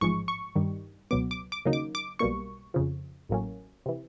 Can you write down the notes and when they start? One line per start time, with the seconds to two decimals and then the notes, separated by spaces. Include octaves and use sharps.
0.01 A1 G#2 F3 G#3 C#6
0.28 C#6
0.55 G2 D#3 G3
1.11 C#2 B2 F#3 B3 D6
1.31 D6
1.52 D6
1.65 D#2 C#3 F#3 A#3 D#4
1.73 D6
1.95 D6
2.19 B1 B2 G3 A#3 C#6
2.74 F2 C#3 F3
3.29 A1 A2 F#3 A#3 C#4
3.86 C3 E3